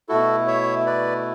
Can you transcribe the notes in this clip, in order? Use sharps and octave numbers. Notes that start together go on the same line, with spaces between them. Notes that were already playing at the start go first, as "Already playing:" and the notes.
B2 A3 E4 F#4 A4
C#5 E5
B4 D5